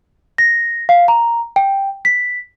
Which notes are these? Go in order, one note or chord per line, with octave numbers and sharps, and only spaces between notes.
A#6
F5
A#5
G5
B6